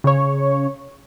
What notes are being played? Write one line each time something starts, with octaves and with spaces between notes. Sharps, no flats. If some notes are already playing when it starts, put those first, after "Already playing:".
C#3 C#5